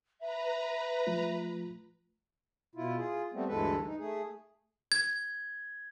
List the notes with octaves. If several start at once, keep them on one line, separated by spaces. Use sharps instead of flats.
B4 E5 A#5
F3 A3 F4
B2 E4 F4
F4 G#4
G3 A3 B3 C4
D2 G2 E3 G#3 A4 B4
D#4
A3 G#4
G#6